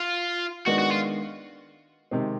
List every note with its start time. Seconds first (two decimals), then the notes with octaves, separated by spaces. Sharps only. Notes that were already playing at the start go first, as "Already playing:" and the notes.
Already playing: F4
0.66 D#3 G#3 B3 D4 F#4
0.79 F#4
0.91 F4
2.11 C3 D#3 G#3 C4